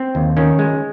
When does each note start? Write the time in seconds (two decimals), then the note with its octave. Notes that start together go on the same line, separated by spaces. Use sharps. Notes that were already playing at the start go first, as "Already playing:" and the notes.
Already playing: C4
0.15 D#2
0.37 D#3 C#4
0.59 G#3